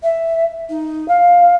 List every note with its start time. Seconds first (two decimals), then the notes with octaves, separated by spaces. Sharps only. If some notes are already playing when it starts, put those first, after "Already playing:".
0.02 E5
0.69 D#4
1.08 F5